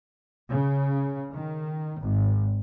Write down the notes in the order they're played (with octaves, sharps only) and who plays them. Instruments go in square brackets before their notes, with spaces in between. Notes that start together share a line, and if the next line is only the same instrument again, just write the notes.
[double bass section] C#3
D#3
G#1